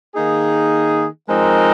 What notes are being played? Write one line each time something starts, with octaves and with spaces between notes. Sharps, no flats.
D#3 A#3 D#4 G#4
F3 G#3 C4 D#4 A#4